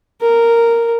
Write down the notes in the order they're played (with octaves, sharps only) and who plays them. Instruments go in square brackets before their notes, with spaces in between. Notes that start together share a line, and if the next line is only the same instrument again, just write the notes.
[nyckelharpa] A#4